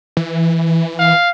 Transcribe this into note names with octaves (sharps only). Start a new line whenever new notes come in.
E3
F5